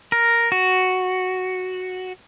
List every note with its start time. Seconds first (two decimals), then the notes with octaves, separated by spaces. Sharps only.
0.12 A#4
0.52 F#4